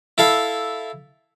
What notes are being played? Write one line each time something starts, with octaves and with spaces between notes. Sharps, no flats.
E4 A4 F5